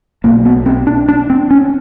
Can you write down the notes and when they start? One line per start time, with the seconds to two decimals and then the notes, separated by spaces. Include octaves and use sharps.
0.24 B1 B2 A#3
0.45 B3
0.66 C4
0.87 D4
1.08 D4
1.30 C4
1.51 C#4